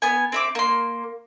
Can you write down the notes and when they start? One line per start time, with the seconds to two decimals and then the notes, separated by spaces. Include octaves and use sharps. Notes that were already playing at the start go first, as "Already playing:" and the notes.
0.02 B3 G#5
0.32 C4 E5 D6
0.55 A#3 C6